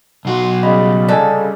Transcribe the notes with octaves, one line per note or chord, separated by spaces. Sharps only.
B1 F#4 C6
C#3 G3 D#5 B5
G#2 C3 A4 D5 D#5 G#5